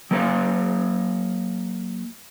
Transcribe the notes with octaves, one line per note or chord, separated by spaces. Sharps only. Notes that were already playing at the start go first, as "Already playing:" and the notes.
F#3 A#3 A#4 B4 C#5 F5